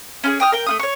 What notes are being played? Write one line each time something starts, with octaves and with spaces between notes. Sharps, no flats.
C#4 F4 G#4
G5 D#6 F6
A#4 G5
A3 F4 D#6
C#5 C#6